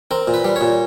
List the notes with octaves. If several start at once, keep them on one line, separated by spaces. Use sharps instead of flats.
C4 A#4
A#2
B4
G3
C#5
A#2